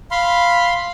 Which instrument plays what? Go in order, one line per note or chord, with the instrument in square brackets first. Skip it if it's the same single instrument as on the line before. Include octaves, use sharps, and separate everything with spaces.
[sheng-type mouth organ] F5 B5 C6